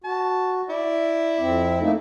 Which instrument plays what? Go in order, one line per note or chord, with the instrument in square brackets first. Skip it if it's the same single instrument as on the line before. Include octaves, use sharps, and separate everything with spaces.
[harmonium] F#4 [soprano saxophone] A5
[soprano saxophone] E4 [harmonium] D5
[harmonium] F2 C4
A3 A#3 D#4